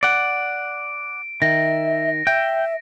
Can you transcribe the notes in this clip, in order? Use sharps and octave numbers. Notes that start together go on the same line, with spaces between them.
D5 F#5 D7
D#3 E5 A#6
E5 G5